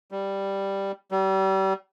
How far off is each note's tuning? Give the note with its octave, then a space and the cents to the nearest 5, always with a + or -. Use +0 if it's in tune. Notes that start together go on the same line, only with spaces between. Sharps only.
G3 +0
G3 -35